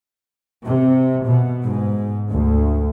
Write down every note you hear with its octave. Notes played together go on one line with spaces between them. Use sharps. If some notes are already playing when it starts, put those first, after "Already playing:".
C3
B2
G#2
D2